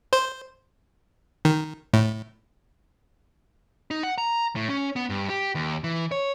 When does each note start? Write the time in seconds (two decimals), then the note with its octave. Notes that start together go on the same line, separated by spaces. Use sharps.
0.13 C5
1.45 D#3
1.93 A2
3.91 D#4
4.03 F#5
4.18 A#5
4.56 A2
4.70 C#4
4.96 B3
5.10 G2
5.30 G4
5.55 D#2
5.84 E3
6.11 C#5